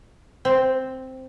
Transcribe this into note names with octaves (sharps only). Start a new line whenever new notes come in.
C4